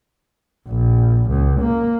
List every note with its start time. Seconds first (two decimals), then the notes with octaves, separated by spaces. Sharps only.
0.68 A#1
1.30 C#2
1.61 A#3